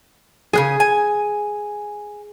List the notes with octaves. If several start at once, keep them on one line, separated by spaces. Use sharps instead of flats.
C#3 G#3 G#4 G#5
G#5